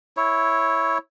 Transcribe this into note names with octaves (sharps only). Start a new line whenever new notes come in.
E4 C#5